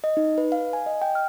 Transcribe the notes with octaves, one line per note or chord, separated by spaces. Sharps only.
D#5
D#4
B4
F5
G#5
D#5
G5
F6